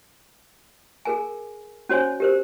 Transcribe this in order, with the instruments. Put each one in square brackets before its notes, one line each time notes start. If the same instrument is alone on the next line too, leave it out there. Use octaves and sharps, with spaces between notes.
[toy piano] G#4 A#4 G#5
C#4 F#4 C5 C#5 G#5
G4 A#4 C5